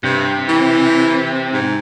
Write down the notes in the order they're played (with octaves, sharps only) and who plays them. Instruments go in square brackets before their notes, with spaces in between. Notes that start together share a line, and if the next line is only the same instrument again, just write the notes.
[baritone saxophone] G2 [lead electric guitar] C3
[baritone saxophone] E3
G#2